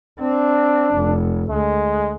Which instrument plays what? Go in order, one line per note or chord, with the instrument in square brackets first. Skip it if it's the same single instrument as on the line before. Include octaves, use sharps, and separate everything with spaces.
[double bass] C4 [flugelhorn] D4
[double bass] F1
[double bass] D2 [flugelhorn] G#3